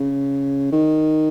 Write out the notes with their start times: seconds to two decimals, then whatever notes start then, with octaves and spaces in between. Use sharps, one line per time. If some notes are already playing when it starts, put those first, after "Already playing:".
Already playing: C#3
0.72 D#3